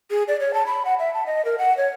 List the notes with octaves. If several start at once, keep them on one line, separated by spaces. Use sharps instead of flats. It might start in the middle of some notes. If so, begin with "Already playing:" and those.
G#4
D5
C#5
A5
B5
F#5
E5
A5
D#5
A#4
F#5
C#5